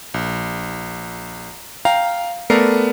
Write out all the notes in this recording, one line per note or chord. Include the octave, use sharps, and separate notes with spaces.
A#1
F5 G5 A#5
A3 B3 A#4 D5 A#5 C7